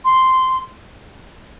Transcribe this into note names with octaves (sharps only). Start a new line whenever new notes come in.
C6